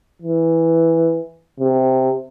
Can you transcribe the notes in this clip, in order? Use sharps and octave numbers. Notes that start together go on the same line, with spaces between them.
E3
C3